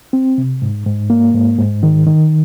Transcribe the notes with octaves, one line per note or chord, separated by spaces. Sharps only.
C4
C3
G#2
G#2
A#3
G#2
G#2
D#3
D#3